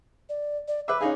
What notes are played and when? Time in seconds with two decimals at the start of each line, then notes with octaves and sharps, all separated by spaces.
0.29 D5
0.68 D5
0.88 B4 E5 D6
1.01 C#4 D#4 G#4 F5